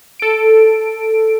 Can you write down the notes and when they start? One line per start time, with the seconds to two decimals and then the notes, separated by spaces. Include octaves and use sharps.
0.20 A4 D7